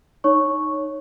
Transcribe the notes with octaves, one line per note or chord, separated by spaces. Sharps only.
D#4 C#5 C#6